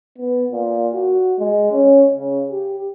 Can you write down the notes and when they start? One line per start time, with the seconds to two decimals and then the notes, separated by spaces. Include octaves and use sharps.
0.18 B3
0.52 A#2
0.94 F#4
1.39 G#3
1.72 C#4
2.14 C#3
2.52 G4